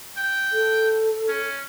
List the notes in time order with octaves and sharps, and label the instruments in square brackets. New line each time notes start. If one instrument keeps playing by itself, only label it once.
[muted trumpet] G5
[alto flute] A4
[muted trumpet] C#4